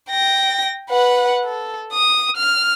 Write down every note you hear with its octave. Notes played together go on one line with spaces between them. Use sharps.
G5 A#6
B4 F#5
A4
D#6
F6